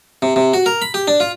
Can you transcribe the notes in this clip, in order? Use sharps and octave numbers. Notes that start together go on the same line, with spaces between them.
C3
C3
F#4
A#4
B5
G4
D4
F4